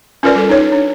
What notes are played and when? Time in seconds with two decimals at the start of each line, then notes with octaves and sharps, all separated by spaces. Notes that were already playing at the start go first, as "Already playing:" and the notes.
0.23 C#4 F4 A#4 B4 D5
0.35 G3 A4
0.49 D#4 C#5
0.72 D4